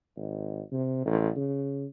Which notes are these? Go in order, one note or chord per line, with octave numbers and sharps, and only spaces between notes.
G#1
C3
A1
C#3